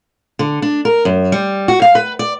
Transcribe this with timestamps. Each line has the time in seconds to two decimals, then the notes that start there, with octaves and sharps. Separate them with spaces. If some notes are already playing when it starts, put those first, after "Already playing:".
0.39 D3
0.62 D4
0.85 A#4
1.05 F#2
1.32 G3
1.68 F#4
1.82 F5
1.95 B4
2.19 D5